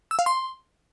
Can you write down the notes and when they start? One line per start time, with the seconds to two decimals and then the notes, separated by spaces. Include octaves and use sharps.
0.11 E6
0.19 F5
0.26 C6